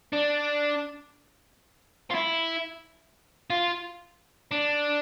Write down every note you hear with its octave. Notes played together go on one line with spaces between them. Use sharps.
D4
F4
E4
F4
D4